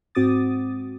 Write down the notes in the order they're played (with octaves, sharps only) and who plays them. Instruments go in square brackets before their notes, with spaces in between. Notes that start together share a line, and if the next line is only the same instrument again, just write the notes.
[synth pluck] G#2 C4 F#4 D6 D#6 A6